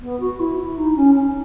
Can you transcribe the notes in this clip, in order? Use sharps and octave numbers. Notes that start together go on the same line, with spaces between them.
B3
F#4
E4
E4
D#4
C#4
C#4